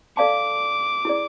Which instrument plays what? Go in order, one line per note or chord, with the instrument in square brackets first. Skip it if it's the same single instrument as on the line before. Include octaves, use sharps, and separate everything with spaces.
[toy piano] A4 D5 F5 A5 [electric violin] D6
[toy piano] E4 G#4 D5